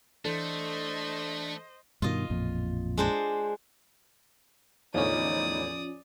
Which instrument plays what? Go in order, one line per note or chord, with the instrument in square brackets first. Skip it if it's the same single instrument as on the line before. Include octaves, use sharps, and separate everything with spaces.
[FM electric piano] E3 A4 [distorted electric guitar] A3 [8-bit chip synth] D4 [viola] C5 D#5
[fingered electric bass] G2 B2 D#3 [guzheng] F4 D#5
[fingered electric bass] A1 F2 A#2
[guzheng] G#3 D4 C5
[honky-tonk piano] E2 A2 D3 [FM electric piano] F3 C#4 [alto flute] D#4 [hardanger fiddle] D5 D#6